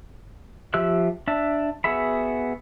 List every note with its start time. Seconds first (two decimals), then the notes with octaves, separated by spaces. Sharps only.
0.74 F3 G4 E5 E6 F#6
1.28 D4 E5 A5
1.84 B3 F#4 G#4 E5 B5